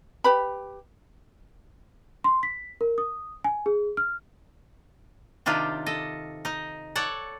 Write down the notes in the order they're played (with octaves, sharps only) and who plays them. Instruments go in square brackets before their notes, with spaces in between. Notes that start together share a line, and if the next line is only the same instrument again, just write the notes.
[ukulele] G4 B4 B5
[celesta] C6
B6
A#4
D#6
G#5
G#4
F6
[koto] C3 D#3 D4 F4 G4
A4 D#5
D#4 D#5
A4 C#5 D5 F#5